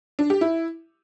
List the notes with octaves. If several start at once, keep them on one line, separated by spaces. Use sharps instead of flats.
D4
G4
E4